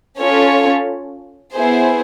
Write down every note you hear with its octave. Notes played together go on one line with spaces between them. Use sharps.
C#4 F4 A4 C#5
B3 E4 G#4 C5